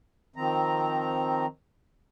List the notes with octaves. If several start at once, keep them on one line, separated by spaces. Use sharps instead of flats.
D#3 F3 C4 A#5